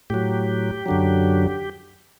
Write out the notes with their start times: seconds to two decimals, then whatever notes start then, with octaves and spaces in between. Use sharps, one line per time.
0.10 A2 F#3 G4
0.86 F#2 D3 F#3